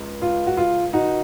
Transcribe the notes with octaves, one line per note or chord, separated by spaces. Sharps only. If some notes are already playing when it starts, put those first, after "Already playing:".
Already playing: C#2
F4
F#4
F4
D#4 F#4